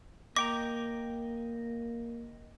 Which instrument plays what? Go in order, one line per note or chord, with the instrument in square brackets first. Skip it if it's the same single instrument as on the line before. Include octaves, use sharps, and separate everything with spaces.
[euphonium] A#3 [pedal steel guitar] D#5 G5 A#5 [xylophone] D6